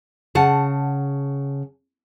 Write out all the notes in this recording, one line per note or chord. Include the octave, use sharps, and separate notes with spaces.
C#3 F#5 A5